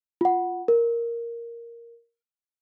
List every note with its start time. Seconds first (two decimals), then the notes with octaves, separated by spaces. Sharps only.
0.21 F4 F#5
0.68 A#4